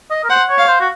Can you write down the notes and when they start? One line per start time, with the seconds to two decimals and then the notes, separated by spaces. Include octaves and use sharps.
0.10 D#5
0.24 A#4
0.29 C5 F#5
0.49 C#5
0.58 F5
0.68 C5
0.80 F#4